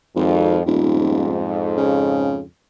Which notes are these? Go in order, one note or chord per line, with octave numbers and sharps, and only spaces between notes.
G#1 F2
D#1 F2 G#2
C#3